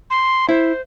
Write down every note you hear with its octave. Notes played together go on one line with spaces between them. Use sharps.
C6
E4 C5